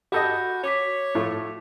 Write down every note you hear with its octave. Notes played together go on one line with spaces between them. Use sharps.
F#4 G4 A4 D#5 B5 G6 A#6
F#4 C#5 D6 B6
A2 F3 A3